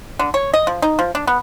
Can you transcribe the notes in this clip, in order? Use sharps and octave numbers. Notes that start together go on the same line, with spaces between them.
D3
C#5
D#5
F3
D#4
F3
D4
B3